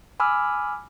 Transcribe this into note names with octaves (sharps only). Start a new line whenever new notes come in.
G#5 B5 D6 E6 F6